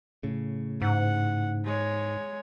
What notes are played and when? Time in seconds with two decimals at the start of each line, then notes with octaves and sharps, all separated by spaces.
0.23 A2 C#3
0.82 G#2 F#5
1.64 G#3 C#5